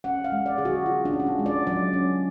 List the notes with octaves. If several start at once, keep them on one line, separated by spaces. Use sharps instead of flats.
C#4 F#5
F5
G#3
D5
D3 G#4
F#4
D3 F4
D4
C#4
D4
F4
G#3
D5
F#3 D5
C#4